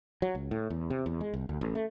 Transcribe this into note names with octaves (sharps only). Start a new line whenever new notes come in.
F#3
C#2
A2
E2
C3
E2
G#3
C2
D2
A1
A3